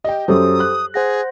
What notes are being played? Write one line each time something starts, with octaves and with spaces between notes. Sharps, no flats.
G4 D#5 G5
F#2 F#3 G4 A4 C5 D#6
F#6
G#4 C5 F#5 A#6